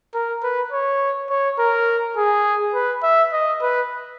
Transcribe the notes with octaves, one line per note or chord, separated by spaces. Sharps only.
A#4
B4
C#5
C#5
A#4
G#4
B4
E5
D#5
B4